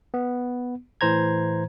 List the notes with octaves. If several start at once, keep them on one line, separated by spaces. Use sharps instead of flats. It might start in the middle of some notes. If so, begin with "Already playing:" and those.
B3
A2 E3 C5 A#5 G#6